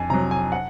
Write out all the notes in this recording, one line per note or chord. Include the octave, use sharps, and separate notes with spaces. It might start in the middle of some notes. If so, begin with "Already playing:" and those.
Already playing: F2 G#5
C3 F#3 A#5
G#5
F#5